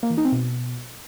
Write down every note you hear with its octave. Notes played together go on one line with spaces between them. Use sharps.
A#3
E3
D#4
C4
B2